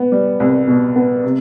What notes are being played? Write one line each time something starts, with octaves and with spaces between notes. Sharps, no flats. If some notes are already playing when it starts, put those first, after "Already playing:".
Already playing: B3
G3
C2
B2
B3
C3